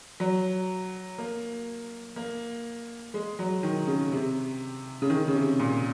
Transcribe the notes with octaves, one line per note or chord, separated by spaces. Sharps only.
F#3
A#3
A#3
G#3
F#3
D#3
C#3
C3
C#3
D#3
C#3
C3
A#2